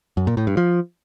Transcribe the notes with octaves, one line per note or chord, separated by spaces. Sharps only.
F#2
A#2
A2
G2
F3